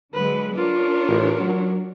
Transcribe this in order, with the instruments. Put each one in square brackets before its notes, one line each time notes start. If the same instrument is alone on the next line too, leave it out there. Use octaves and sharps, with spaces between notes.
[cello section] D3 F#3 G#3 [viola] B4
[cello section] D4 A#4 C#5 [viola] F4
[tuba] A1
F#3